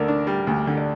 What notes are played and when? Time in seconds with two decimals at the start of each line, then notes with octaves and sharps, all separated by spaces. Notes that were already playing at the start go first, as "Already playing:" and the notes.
Already playing: D2 D3 A#4 D5
0.08 D4
0.27 G3
0.47 D2
0.67 D3
0.77 D5